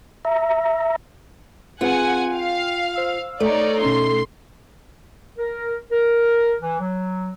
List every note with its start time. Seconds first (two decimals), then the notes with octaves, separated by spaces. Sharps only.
0.25 E5 A#5
1.81 C4 F4 G#4 B4 F#5 G#5
2.34 F5 G5
2.93 C5 E6 F6
3.40 A3 D#4 C#5 D5
3.82 B2 C#4 D#4 C6
5.38 A#4
5.91 A#4
6.61 E3
6.80 F#3